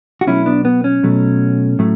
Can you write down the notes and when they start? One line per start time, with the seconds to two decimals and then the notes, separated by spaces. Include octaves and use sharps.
0.21 F#4
0.27 B2 F#3 A3 C#4 E4
0.46 B3 D4
0.65 B3
0.84 C#4
1.03 B2 F#3 A3
1.79 A2 F#3 A3